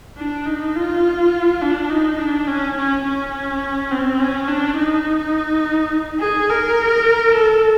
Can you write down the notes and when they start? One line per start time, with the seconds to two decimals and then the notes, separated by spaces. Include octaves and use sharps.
0.18 D4
0.46 D#4
0.75 F4
1.62 D4
1.90 D#4
2.19 D4
2.47 C#4
2.76 C#4
3.05 C#4
3.91 C4
4.19 C#4
4.48 D4
4.77 D#4
6.20 G#4
6.49 A#4
7.35 A4